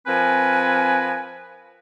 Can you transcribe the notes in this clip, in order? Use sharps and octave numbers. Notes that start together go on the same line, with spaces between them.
F3 C4 A#4 B4 G#5